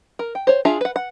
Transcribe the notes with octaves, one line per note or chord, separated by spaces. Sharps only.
A#4
G5
C5 C#5
D4 F4 G#4 E5 A#5
B4 F#5
F#5